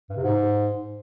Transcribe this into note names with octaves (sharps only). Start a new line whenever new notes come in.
G2
C3
G#2